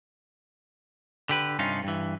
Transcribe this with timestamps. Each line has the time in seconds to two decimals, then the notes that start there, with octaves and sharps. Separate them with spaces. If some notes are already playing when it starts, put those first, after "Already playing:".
1.29 D3 G4 B4
1.59 G2 C3 C#4 D#4 F4
1.84 G2 E3